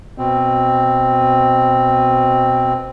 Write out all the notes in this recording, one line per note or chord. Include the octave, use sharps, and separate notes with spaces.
B2 C4